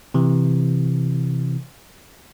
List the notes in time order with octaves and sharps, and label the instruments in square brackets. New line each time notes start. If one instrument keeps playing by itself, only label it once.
[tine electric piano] C3 E3